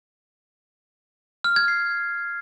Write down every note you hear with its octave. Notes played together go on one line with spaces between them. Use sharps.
F6
G#6
C7